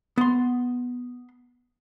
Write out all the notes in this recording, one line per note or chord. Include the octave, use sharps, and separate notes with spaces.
B3 C6